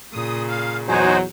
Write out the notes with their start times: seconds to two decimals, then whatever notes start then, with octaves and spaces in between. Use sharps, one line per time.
0.13 A#2 C#3 D#6
0.48 F5
0.88 E2 F#3 D#4 F#4 C5 G#5